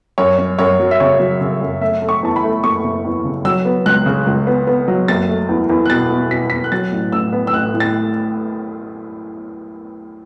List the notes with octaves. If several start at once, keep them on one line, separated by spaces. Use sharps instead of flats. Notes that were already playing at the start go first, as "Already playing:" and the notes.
F#2 C#5
C#4
F#2 C#5
F#3
E5
C#3 C#5
F#3
C#3
F#2
A3 E5
A3
C#6
E2 A5
B5
A3
F#1 C#6
F#1
E2
C#3
F#3 E6
B3
C#2 F#6
C#3
C#2
B3
B3
F#3
F#1 A6
A3
E2
E2
F#6
B2 A6
B2
B2 B6
E2 B6
F#6
F#3 A6
A1
A1 E6
B3
E6
A1 F#6
A2
A6